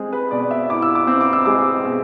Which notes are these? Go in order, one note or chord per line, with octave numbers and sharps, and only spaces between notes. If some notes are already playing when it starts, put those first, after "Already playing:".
Already playing: G#3 C4 G#4
B4
B2 D5
E5
E4 D6
E6
D6
C4 E6
D6
E6
G#3 D6
B2